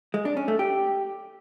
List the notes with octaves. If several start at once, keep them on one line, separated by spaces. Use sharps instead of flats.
G#3
D4
C#4
A3
G4